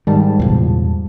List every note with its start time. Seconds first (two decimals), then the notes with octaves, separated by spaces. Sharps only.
0.07 G#2 D#3 G3 A5
0.39 E2 A#2 C#3